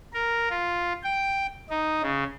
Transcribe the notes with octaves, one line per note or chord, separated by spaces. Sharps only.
A#4
F4
G5
D#4
C#3